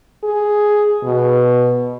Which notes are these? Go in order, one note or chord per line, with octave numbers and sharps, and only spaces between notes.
G#4
B2